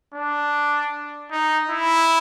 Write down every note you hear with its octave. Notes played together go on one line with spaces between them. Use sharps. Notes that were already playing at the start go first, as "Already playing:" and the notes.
D4
D#4
E4